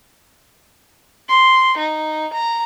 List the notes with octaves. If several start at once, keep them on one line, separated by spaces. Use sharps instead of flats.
C6
D#4
A#5